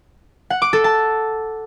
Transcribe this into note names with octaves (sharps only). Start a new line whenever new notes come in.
F#5
D6
A4
A5